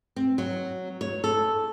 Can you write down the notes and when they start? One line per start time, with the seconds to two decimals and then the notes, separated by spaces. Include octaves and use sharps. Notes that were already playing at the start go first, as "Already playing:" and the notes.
0.16 C4
0.38 F#3
1.01 C#5
1.24 A4